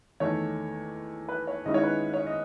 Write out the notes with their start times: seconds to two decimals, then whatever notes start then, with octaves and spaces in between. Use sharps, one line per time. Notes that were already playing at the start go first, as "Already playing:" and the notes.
0.20 E2 D#3 A3 C#5
1.28 B4
1.47 C#5
1.65 G#2 D#3 G#3 C#4 E4 D#5
1.74 C#5
1.83 B4
2.14 C#5
2.27 D#5